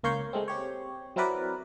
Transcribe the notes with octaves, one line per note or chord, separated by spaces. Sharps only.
C#2 A#3 A#4 C#5 C6 G6
G#3 A3 C4
C4 G4 C#5
F#3 C4 E4 A#4 B4 D5